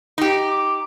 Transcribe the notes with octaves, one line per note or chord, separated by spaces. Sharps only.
D#4 G4
D6